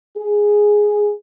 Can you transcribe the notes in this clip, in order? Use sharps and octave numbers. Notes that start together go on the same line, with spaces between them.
G#4